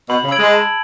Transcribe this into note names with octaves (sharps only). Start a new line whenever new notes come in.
B2 B5
C#3
E6 G#6 D7 F#7
G#3
A5